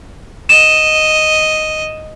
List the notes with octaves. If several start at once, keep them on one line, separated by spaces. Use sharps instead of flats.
D#5 E7